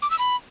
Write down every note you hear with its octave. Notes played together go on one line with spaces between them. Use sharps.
D6
E6
B5